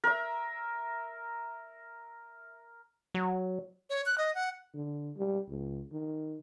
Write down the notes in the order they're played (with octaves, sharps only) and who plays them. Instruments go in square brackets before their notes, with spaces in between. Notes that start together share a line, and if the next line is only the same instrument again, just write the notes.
[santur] A#4 E5
[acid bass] F#3
[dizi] C#5
F#6
D#5
F#5
[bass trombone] D3
G3
C#2
D#3